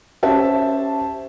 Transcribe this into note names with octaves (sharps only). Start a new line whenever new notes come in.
C#4 G4 C5 E5 A5